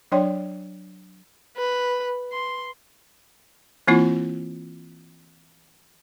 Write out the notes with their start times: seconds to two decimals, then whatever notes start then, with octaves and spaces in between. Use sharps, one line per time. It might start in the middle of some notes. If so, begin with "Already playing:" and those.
0.12 F#3 D4 C#5 D5 G5 C6
1.57 B4
2.33 C6
3.87 E3 A#3 C4 E4 F4